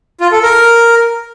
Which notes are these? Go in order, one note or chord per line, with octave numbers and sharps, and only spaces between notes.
F4
A4
A#4